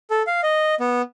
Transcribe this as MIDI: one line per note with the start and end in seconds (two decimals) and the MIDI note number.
0.10 0.22 69
0.27 0.41 77
0.43 0.75 75
0.80 1.02 59